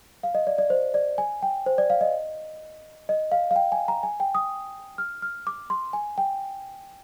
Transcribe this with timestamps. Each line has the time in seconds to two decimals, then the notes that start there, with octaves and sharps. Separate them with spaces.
0.23 F5
0.35 D#5
0.47 D5
0.58 D5
0.70 C5
0.94 D5
1.18 G#5
1.42 G5
1.66 C5
1.78 D5
1.90 F5
2.01 D#5
3.09 D#5
3.32 F5
3.51 F5
3.56 G5
3.72 G#5
3.88 A#5
4.03 G#5
4.20 G5
4.35 D#6
4.98 F6
5.22 F6
5.47 D6
5.70 C6
5.93 G#5
6.18 G5